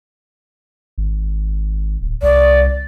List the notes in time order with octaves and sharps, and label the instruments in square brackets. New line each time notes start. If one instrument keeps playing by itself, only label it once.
[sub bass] G#1
D1
[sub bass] C2 [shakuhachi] D5